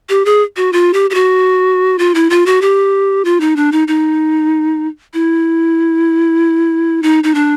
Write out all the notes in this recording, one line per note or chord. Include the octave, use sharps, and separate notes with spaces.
G4
G#4
F#4
F4
G4
G4
F#4
F4
E4
F4
F#4
G4
F4
D#4
D4
D#4
D#4
E4
D#4
D#4
D4